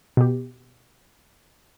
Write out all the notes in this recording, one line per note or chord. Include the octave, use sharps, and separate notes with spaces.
B2 G4